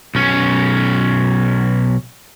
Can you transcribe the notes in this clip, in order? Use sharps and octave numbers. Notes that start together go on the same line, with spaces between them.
B1 C#4